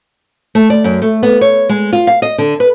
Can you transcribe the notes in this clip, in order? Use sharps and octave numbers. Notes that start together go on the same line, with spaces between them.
A3
D5
F#2
A3
B3
C#5
G#3
F4
F5
D#5
D3
B4